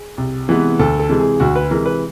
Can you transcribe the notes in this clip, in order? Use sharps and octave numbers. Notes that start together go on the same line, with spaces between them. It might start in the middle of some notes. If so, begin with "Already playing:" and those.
Already playing: G#4
C2
C3 E3 G#3 B3
D2 A4
A4
C3 E3 G#3
G#4
D2 F#4
B4
C3 E3 G#3 A#4
B4